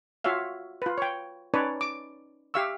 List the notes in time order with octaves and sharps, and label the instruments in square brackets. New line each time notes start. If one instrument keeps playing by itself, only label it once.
[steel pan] F4 F#4 C#5 E5 F5
F4 B4
C#5 G5
C#4 D#4 B4 C#5 D5 A5
D6
G4 E5 F5 C#6 E6